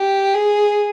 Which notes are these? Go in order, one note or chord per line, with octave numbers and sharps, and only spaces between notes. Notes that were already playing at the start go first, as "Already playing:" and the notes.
Already playing: G4
G#4